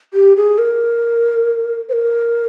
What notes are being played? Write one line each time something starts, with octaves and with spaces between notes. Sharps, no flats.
G4
G#4
A#4
C5
A#4